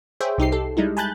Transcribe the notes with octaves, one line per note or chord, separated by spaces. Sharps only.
G#4 C5 C#5 E5 G5
C2 D#4 G4 C7
G4 A4
G3 G#3 D#4 E4
G#5 A5 B5 F#6 G6 A6